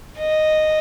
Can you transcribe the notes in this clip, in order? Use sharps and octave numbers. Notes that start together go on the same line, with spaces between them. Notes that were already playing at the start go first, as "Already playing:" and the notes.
D#5